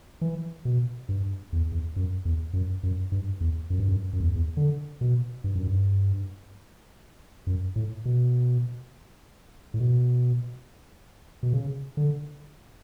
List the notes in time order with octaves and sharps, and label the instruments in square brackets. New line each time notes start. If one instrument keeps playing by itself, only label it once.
[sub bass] E3
B2
G2
E2
E2
F#2
E2
F#2
F#2
G2
E2
F#2
G2
F#2
F#2
E2
E2
D3
B2
G2
F#2
G2
F#2
A2
B2
A2
B2
B2
C#3
D3